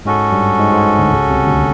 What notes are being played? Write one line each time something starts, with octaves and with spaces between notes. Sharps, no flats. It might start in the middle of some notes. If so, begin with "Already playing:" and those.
G#2 G#3 C#4 F#4 A4
G2 G3
G#2 G#3
G#2 G#3
D2 D3
C#2 C#3
C2 C3
D2 D3